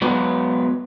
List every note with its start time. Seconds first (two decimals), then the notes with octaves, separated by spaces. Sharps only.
0.02 F#3 G#3 B3 B4